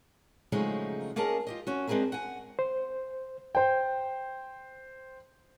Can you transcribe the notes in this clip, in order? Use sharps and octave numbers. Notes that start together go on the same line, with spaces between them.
C#3 F3 F#3 G#3 A3 D#4
A#3 C#4 G#4 A#4 D#5 A5
F4 G4 D#5
C#4 F#4
G#3 C4 D4 G#4 A#4 E5
F#5 G#5
C5
C5 G5